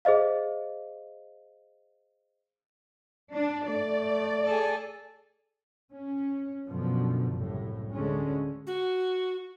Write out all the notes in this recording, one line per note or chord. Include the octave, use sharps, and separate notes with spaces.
G#4 C5 D#5 F5
D4
A3 D5
G#4 A4
C#4
F#2 B2 D3 F3
F#1 C2 A2
D2 D3 G#3 C#4
F#4